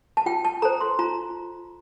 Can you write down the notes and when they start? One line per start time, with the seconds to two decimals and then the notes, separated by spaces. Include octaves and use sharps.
0.17 A5
0.26 F4 G5
0.45 A5
0.62 A4 C5 A#5
0.81 C6
0.99 F4 A#5